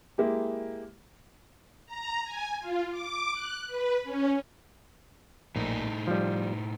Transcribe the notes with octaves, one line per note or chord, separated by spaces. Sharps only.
G#3 A#3 E4 G4
A#5
G#5
F4
D6
F#6
B4
C#4
A#1 A2 D#4
F3 G3